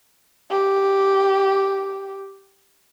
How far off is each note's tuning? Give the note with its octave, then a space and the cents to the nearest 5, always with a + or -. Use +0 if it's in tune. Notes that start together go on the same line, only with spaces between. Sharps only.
G4 -5